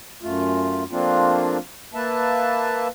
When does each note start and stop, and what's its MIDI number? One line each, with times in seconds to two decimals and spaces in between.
0.23 0.83 42
0.23 0.83 57
0.23 0.83 65
0.91 1.57 53
0.91 1.57 57
0.91 1.57 58
0.91 1.57 60
0.91 1.57 62
0.91 1.57 65
1.94 2.88 58
1.94 2.88 71
1.94 2.88 76
1.94 2.88 81